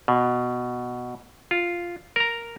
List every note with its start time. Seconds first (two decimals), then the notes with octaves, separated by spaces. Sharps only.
0.08 B2
1.51 F4
2.16 A#4 A#5